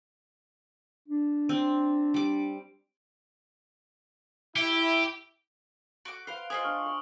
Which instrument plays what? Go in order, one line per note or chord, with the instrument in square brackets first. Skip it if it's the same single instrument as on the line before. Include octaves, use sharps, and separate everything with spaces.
[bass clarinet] D4
[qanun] C4
G3 D6
[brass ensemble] E4 [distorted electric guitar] G4
[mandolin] F#4 D6 [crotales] D7
[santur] B4 F#5 [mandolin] C5 F5
[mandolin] F4 G4 G#4 [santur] C5 D#5 [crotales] D#6 F#7
[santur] D4 C#6 [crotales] F6
[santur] C6